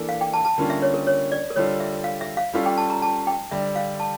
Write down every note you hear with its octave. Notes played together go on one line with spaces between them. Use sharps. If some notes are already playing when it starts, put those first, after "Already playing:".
Already playing: E3 A#3 D4 A4
F5
G5
A5
A5
D3 G3 A#3 C#4 F4
E5
C#5
A#4
C#5
D5
A#4
D3 G3 D4 F4 A4 C#5
E5
F5
E5
F5
G3 C#4 F4 A4 F5
G5
A5
A#5
A5
G5
D3 G3 D4 E5
F5
A5